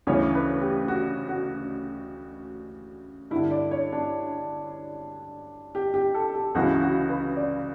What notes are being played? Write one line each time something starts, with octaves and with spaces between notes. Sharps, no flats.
D2 C#3 E3 C#5
B4
G4
F#4
F#4
G2 D3 E4
D5
C#5
D4
G4
G4
A4
G4
C#2 C#3 E3 F#4
F#4
B4
D5